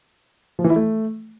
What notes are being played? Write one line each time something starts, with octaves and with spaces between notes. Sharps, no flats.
F3
E3
E4
A3